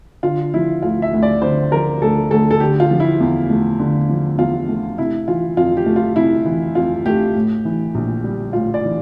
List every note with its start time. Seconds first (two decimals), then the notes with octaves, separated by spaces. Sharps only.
0.23 D3 F4
0.54 F3 E4
0.83 D2 F4
1.02 E5
1.13 D2
1.23 D5
1.42 D3 C5
1.72 F3 A#4
2.01 D2 A4
2.31 D2 A4
2.51 A4
2.60 D3 G4
2.80 F4
2.91 F3
3.00 E4
3.20 E2
3.50 A3
3.79 D3
4.09 F3
4.38 E2 F4
4.68 A3
4.98 C3 E4
5.28 E3 F4
5.57 F2 F4
5.77 G4
5.86 A3
5.96 F4
6.16 C3 E4
6.46 E3
6.75 F2 F4
7.06 A3 G4
7.36 A2
7.65 E3
7.95 A#1
8.24 G3
8.53 A2 F4
8.74 D5
8.84 E3